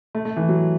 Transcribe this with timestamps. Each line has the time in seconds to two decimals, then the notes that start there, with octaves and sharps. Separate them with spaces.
0.15 A3
0.25 A3
0.37 E3
0.49 F#3